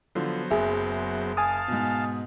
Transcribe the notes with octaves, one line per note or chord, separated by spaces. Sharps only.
D3 F3 F#3 B3 C5
F#1 G#4 E5
F5 G#5 A5 D#6
G#2 B2